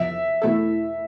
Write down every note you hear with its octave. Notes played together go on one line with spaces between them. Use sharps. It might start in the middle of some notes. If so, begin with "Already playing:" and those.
Already playing: E2 C3 F3 E5
E2 B2 A3 E4 A4